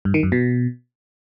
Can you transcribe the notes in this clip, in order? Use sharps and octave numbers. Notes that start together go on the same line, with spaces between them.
G2
D#3
F#2
B2